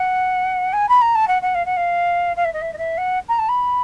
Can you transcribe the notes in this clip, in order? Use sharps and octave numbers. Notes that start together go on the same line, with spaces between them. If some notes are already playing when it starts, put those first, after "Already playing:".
Already playing: F#5
G#5
B5
A#5
A5
F#5
F#5
F5
F#5
F5
F5
E5
D#5
E5
D#5
E5
F#5
A#5
A5
B5